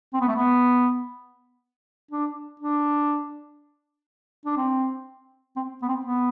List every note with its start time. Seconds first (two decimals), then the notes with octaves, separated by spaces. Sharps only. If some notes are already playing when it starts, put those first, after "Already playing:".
0.13 C4
0.21 B3
0.28 A3
0.35 B3
2.11 D4
2.60 D4
4.46 D4
4.57 C4
5.56 C4
5.82 B3
5.89 C4
6.05 B3